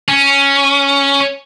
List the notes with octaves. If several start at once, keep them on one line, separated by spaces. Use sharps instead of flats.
C#4